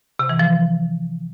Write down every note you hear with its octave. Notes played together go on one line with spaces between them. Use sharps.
C3
E3
F3